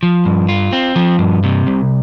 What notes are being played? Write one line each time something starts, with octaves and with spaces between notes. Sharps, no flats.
F3
G2
F4
C4
F3
G2
C3
C2